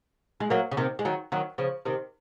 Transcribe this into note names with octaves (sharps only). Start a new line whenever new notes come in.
G#3
F#3 A#3
C#3
C3 D#3
G#3
D#3 F#3
D#3 F#3
C#3 F3
C3 D#3